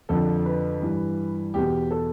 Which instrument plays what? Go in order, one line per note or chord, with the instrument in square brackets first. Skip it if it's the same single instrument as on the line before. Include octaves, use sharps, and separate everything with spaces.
[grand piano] F2 D3 F3 A4
B4
G2 E3
E2 B2 G4
A4